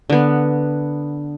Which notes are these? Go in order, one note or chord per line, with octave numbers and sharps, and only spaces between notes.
D3 B3